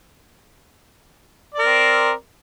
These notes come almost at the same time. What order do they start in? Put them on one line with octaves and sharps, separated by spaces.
D5 A#4 C4